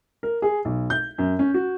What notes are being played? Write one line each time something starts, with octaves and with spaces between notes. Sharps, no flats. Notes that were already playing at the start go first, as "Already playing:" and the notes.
A#4
G#4
B1
G6
F#2
C#4
F#4